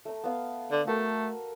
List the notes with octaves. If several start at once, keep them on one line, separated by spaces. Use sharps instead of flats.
A3 A#5
B3 F5
D3
A3 F#4 A4 A#4